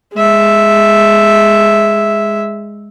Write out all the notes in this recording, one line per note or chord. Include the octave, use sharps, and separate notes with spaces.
G#3 E5